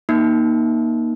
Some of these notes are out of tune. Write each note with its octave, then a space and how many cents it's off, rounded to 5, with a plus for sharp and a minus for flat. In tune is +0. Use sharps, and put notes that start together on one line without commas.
A#3 +25 D#4 +0